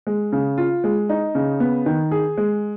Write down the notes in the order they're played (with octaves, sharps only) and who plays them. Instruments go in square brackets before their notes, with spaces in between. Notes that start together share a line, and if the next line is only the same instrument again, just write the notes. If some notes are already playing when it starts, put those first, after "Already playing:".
[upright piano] G#3
C#3
F4
G#3
D#4
C#3
B3
D#3
G#4
G#3